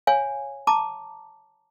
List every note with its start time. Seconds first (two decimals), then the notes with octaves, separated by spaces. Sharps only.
0.07 C#5 F5 G#5
0.67 A5 A#5 D6